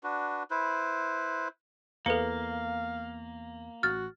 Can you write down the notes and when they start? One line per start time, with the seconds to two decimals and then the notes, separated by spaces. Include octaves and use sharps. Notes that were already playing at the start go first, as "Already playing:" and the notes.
0.03 D4 F#4 B4
0.51 E4 B4 C5
2.06 E2 A#3 A4 B4 F5 C#7
3.83 A1 F#4 F6 A6